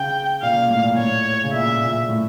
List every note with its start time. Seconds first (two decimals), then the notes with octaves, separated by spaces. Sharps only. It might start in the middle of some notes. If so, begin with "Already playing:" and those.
Already playing: C#3 G5
0.42 A#2 F5
0.56 A#2
0.70 A2
0.84 A#2
0.97 A2 C#5
1.43 C#3
1.53 A#2 E5
1.81 A#2
2.09 A2